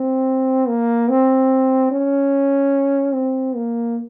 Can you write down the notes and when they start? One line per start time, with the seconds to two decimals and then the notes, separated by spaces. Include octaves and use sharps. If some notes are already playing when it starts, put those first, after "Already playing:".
Already playing: C4
0.68 A#3
1.09 C4
1.91 C#4
3.14 C4
3.56 A#3